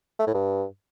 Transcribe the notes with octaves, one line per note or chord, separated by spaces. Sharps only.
A3
A2
G2